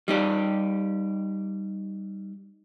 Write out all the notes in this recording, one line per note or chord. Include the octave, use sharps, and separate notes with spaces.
G3 D#4 G4